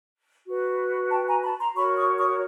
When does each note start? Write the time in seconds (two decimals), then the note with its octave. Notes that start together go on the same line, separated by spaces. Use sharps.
0.46 F#4 B4
1.10 G5 A5
1.27 G#5 A#5
1.43 A5 B5
1.59 A#5 C6
1.75 F#4 A#4 C#5 B5 C#6
1.97 C#6 D#6
2.18 C#6 D#6